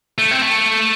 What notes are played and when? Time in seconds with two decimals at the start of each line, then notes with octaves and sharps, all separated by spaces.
0.18 A3
0.31 C4
0.42 A3